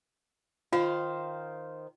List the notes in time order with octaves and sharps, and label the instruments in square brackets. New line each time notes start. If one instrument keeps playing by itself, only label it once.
[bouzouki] D#3 C5 F5 [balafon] F4